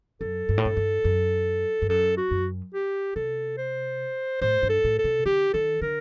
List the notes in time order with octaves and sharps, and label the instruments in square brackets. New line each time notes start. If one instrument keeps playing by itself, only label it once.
[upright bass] F#2 [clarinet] A4
[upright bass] G2
A2
G2
G2
F#2
G2
[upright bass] F#2 [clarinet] A4
[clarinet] F#4
[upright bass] F#2
[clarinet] G4
[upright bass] C3 [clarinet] A4
[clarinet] C5
[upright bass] A2 [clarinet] C5
[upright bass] G2
[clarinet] A4
[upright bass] A2
[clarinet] A4
[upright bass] C3
[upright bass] D3 [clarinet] G4
[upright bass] D#3 [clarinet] A4
[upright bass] D3 [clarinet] A#4